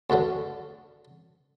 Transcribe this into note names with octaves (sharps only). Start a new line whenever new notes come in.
D2 G2 D3 F#3